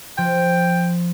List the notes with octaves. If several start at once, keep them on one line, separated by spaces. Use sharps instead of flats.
F3 G5